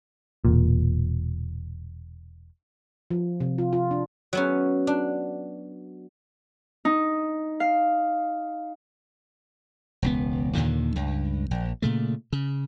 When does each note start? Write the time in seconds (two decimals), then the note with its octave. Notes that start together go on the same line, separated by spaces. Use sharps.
0.45 E1 A#2
3.11 F3
3.40 C3
3.58 F4
3.73 F4
3.91 D4
4.33 F#3 B3 C#4
4.87 D4
6.85 D#4
7.60 F5
10.02 E1 C#2 B3
10.54 D#2 A#2 D3 D#3
10.96 C#2 G2
11.51 A#1
11.82 A#2 C#3 A3
12.33 C#3